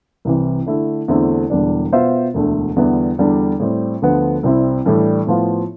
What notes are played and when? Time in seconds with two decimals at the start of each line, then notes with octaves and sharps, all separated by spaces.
0.25 C2 C3 E3
0.66 D3 A3 E4
1.08 E2 D3 A3 C4 E4
1.50 E1 E2 D3 G3 D4
1.92 B2 B3 F4 C5 E5
2.34 E1 D2 D3 A3
2.76 E2 D3 G3 B3 E4
3.18 E2 D3 G3 D4 A4
3.60 A2 G3 C4
4.02 D2 D3 F3 B3
4.43 C2 C3 G3 C4 E4
4.85 A2 E3 G3 D4 A4
5.27 A2 F3 B3 F4